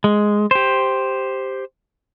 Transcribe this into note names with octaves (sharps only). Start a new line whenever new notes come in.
G#3
G4 C5